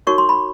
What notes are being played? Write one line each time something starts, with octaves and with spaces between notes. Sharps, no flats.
D#4 F#4 A#4 C#5 C#6
C6
B5